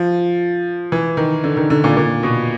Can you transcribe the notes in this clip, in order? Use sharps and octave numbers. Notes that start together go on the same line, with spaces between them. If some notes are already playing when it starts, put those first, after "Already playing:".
Already playing: F3
E3
D#3
D3
D#3
D3
A#2
A#2
B2